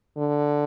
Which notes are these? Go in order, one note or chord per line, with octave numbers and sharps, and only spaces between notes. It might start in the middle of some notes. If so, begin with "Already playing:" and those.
D3